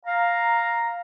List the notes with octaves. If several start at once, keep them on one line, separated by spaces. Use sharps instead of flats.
F5 A#5